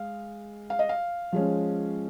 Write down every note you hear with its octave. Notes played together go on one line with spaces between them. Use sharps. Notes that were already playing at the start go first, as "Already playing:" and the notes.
Already playing: G#3 F5
F5
D#5
F5
F3 G#3 C#4